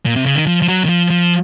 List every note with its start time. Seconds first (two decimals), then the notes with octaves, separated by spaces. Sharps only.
0.06 A#2
0.16 C3
0.26 C#3
0.36 D#3
0.47 F3
0.62 F3
0.68 F#3
0.85 D#3
0.89 F3
1.10 F3